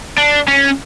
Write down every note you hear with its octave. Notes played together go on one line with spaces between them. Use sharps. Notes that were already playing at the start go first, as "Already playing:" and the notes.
D4
C#4